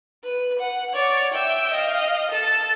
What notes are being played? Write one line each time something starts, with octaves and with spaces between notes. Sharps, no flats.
B4
F#5
C#5 D5
E5 G5
D#5 F5
A4 A5